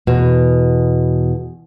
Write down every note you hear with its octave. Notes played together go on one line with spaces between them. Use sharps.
E2 B2